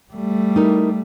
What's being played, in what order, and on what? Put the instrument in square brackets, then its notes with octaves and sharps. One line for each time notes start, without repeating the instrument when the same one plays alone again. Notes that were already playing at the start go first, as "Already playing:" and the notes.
[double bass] G3 A3
[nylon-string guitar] D#4 E4 A#4